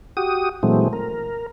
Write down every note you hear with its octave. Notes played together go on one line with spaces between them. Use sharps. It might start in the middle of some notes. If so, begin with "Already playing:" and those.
F#4 G4 D#6
A#2 E3 F#3 G#3 A3 C4
A#4